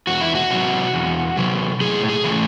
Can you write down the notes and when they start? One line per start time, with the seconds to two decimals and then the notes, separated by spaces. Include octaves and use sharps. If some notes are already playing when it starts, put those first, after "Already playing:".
0.07 E2 F#4
0.21 E4
0.35 F#4
0.51 C3 F#3
0.94 E2
1.37 C3 F#3
1.81 A2 G#4
2.09 G#4
2.24 E3 A3